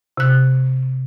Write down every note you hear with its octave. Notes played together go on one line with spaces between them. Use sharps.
C3 F#6